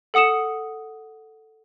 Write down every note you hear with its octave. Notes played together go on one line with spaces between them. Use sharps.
A4 F#5 D#6 C#7 E7